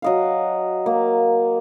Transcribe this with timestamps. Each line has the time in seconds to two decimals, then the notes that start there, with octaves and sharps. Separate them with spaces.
0.02 F#3 D#5 F5
0.86 A#3